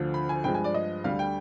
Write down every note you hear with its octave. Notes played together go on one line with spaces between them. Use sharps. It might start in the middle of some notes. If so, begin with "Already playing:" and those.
Already playing: D2 D3 F3
B5
G#5
G2 F3 G#3 G5
G#5
D5
D#5
D2 D3 G3 F5
G5